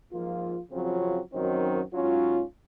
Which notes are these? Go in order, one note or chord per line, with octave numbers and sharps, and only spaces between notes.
G#2 F3 A#3 F4
F2 C#3 F#3 C4 F4
F#2 D#3 F#3 C4 D#4
G#2 F#3 C#4 F4